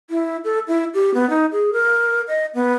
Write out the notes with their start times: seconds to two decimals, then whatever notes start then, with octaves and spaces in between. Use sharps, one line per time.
0.10 E4
0.44 A4
0.68 E4
0.94 G4
1.14 B3
1.30 D#4
1.52 G#4
1.73 A#4
2.28 D#5
2.54 B3